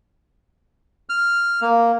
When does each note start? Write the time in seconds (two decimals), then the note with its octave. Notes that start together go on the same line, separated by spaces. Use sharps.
1.09 F6
1.61 A#3